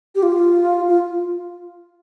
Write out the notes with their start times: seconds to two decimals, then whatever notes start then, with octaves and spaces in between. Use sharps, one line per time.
0.15 G4
0.23 F4
0.88 F4